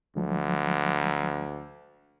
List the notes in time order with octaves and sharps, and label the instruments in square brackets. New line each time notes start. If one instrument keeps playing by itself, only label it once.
[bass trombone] D2 [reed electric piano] F3 F#3 G#3